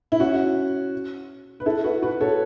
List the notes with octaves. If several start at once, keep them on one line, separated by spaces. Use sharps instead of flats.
E4
C#4 F#4
B4
E4 A4
F#4 B4
F#4 B4
A4 C#5